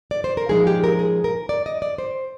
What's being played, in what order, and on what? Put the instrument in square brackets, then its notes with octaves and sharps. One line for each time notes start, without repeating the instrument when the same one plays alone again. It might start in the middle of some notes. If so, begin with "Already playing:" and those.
[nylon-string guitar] D5
C5
A#4
A#2 F3 G#3 D#4 G#4
G4
A#4
G#4
A#4
D5
D#5
D5
C5